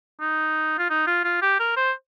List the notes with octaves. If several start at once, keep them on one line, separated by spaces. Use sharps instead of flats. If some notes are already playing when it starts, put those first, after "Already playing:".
D#4
F4
D#4
F4
F4
G4
A#4
C5